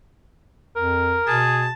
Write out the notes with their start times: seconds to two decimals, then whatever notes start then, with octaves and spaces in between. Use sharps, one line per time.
0.76 F2 A#4
1.27 B2 G#4 A5